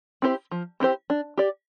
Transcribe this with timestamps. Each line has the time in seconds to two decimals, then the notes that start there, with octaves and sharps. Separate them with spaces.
0.22 C4 E4 G4 C5
0.51 F3
0.80 C4 E4 G4 C5
1.10 D4
1.38 G4 D5